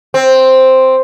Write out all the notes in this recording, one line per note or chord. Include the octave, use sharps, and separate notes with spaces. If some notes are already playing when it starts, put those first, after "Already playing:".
C4